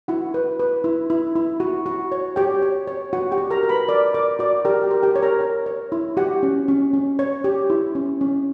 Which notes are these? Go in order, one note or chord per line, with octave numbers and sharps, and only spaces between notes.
E4 F#4 F#5
B4
B4
E4
E4
E4
F#4
F#4
C#5
G4 C#5 G5
C#5
C#5
F#4 F#5
G4 G5
F#4
A#4 A#5
A#4
B4 B5
A#4 D5 D6
A#4 D5 D6
F#4 D5 D6
G4 A#4 G5
G4 G5
A#4
G4 G5
C#5
A#4 A#5
A#4
C#5
E4
F#4 G4 F#5
C#4
C#4
C#4
C#5
G4
E4
C#4
C#4